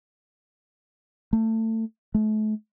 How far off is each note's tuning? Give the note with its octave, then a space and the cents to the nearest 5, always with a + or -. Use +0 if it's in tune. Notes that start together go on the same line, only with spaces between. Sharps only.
A3 +25
A3 -35